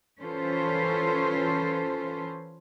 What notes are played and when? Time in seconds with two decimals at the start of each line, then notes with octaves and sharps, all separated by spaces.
0.20 E3 C#4 F4 A4 B4 C5